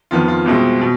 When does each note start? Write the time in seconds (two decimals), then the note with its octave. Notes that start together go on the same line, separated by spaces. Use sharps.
0.11 F2 D#3 B3 F4
0.28 F4
0.46 C2 B2 G#3 C4
0.81 B2